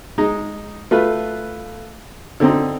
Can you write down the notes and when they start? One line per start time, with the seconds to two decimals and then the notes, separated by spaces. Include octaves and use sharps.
0.18 G#3 D#4
0.91 A3 F4 B4
2.40 D3 C4 D#4